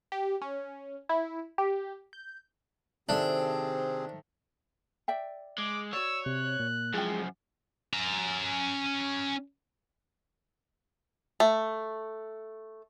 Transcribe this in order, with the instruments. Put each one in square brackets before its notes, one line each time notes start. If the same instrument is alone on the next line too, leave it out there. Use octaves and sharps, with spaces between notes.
[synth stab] G4
C#4
E4
G4
G6
[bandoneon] C3 C4 G#4 [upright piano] D#3 A4 E5 [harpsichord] D4 [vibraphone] C5
[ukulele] D5 E5 G5
[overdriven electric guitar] G#3 [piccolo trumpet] D6
[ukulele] F#4 D5 [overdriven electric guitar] C#5 [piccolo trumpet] E6
[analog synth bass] C3 [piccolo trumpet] F#6
[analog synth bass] A#2
[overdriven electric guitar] F#2 F3 [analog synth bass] G#3 [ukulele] E4 G5
[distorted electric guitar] C#4 A#5
[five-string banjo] A3